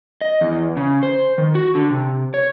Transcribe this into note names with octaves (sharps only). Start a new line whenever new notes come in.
D#5
E2
C#3
C5
D#3
F#4
D3
C3
C#5